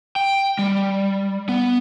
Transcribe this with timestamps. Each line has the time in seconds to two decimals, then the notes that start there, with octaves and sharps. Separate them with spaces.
0.16 G5
0.59 G3
1.49 B3